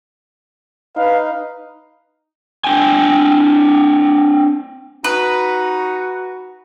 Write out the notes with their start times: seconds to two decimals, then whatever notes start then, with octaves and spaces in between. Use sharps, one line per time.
0.97 D#4 B4 F5
2.64 C4 D4 G5 G#5
5.04 D#4 F#4 B4